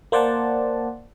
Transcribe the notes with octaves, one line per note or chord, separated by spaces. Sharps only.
A#3 C5 D5 F#5 A5